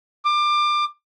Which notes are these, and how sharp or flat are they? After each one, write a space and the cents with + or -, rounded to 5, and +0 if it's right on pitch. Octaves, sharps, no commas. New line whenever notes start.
D6 +25